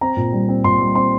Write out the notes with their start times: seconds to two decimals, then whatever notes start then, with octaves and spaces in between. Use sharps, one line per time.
0.01 C4 A#5
0.17 A#2
0.33 G3
0.49 C4
0.64 A#2 C6
0.80 G3
0.95 C4 C6